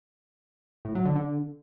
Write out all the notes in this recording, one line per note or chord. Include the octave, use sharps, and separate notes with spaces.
A2
F#3
D3
D3